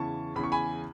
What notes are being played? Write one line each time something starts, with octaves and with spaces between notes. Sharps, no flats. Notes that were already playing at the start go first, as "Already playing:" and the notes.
Already playing: E2 C#3 E3 A5 C#6
E2 C#3 E3 B5
C#6
G#5 B5